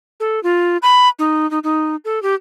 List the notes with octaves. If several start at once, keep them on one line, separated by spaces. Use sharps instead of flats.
A4
F4
B5
D#4
D#4
D#4
A4
G4